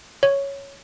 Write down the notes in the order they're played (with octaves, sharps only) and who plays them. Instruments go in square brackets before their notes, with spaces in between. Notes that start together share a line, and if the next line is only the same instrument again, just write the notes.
[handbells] C#5